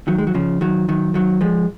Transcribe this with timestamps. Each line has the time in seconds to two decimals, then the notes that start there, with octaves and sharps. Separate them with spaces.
0.08 D#3 F#3
0.18 G#3
0.27 F#3
0.35 C#3 F3
0.61 D#3 F#3
0.89 D#3 F#3
1.14 D#3 F#3
1.41 F3 G#3